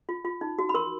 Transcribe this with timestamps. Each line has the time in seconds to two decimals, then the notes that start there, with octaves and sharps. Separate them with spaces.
0.09 F4
0.25 F4
0.41 D#4
0.59 F#4
0.69 B5
0.74 A#4 C6